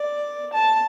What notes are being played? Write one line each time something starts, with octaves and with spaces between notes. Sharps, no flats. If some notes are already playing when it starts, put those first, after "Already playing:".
Already playing: D5
A5